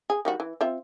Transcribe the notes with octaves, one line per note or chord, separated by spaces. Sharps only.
G#4
D#3 G3 F#4
E3
C4 F4 E5